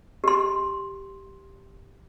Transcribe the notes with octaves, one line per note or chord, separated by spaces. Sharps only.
G4 C6